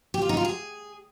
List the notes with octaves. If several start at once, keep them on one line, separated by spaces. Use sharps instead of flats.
G4
F4
D#4
F4
G#4